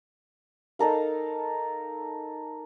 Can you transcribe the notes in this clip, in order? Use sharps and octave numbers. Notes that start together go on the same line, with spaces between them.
D#4 A4 A#4 F5